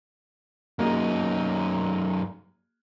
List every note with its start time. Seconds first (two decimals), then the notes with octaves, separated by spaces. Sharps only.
0.79 F#2 A#3 D#4 F#4 G#4